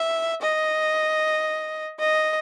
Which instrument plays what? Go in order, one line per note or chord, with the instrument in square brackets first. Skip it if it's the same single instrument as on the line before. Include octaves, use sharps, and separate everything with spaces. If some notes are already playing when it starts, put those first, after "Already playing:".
Already playing: [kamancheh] E5
D#5
D#5